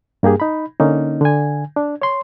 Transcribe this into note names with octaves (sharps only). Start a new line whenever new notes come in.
G2 A#3 G4 G#4
D#4 B5
D3 A#3 C#4 D#4
D3 G#5
D4
C#5 C6